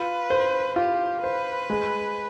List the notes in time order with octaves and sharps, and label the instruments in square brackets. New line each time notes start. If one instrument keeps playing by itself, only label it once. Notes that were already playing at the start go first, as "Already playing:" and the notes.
Already playing: [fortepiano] F4 [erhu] B4
[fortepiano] C5
[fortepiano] F4 [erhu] G4
[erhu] B4 [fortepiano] C5
[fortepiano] G#3